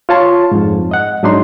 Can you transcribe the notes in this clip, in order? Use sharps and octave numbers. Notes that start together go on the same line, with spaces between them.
F4 C#5 A5 C6
F2 G#2
D#5 F#5
G#2 F#3 D4 D#4 C6